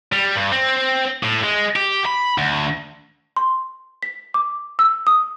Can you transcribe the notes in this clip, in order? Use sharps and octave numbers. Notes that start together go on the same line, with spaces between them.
G3
G2
C4
A2
G#3
G4
B5
D2
C6
B6
D6
E6
D#6